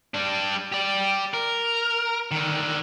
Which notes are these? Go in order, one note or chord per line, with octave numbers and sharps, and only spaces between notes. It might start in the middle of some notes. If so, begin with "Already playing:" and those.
G3 D4
G4 D5
A#4
D3 D#3